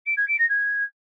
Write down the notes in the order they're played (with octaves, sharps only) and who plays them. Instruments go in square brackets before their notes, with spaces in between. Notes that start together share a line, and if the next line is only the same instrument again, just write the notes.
[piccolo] D7
G#6
D7
A#6
G#6